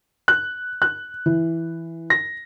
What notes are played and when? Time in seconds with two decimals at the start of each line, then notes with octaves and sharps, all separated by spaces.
0.28 F#6
0.82 F#6
1.26 E3
2.10 A#6